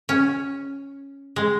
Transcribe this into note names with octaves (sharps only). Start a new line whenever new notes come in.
C#4
G#3